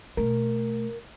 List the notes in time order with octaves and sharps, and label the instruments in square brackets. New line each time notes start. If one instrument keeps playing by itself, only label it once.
[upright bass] B2 A3 [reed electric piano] A#4